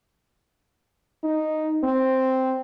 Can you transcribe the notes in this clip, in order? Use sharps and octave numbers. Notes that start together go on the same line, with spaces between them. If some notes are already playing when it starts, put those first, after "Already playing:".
D#4
C4